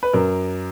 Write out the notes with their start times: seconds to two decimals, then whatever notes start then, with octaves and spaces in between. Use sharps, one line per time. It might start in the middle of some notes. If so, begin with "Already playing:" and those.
0.03 B4
0.13 F#2 A#4